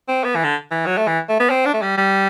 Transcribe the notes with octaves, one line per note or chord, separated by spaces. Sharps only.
C4
B3
E3
D3
E3
F#3
A3
E3
A3
B3
C4
D4
A3
G3
G3